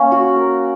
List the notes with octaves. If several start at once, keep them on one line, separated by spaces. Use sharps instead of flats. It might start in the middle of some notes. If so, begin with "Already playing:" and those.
Already playing: A#3 C#4
F#4
A#4